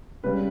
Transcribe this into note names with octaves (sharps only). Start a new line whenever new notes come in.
C#3 G3 B4